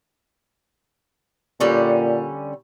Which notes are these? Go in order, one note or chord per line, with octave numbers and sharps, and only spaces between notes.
A#2 D3 G3 C#4